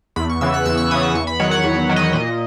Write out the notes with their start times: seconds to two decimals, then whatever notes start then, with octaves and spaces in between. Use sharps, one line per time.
0.16 E2 B5
0.30 C#6
0.41 C#3 E3 B3 E6
0.54 F#6
0.65 E2 E6
0.78 C#6
0.91 C#3 E3 B3 D#6
1.03 F#6
1.14 E2 C#6
1.27 B5
1.40 D#3 F#3 C#5
1.51 F#5
1.64 E2
1.89 D#3 F#3
1.96 D#5
2.13 A#2 D#5